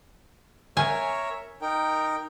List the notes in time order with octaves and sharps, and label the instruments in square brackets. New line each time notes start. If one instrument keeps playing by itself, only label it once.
[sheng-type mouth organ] A#4 C#5 E5 [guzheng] G#5
[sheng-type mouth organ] D#4 A#4 G5